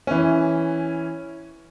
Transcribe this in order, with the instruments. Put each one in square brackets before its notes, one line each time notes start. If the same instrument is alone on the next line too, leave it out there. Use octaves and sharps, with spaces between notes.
[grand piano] E3 C#4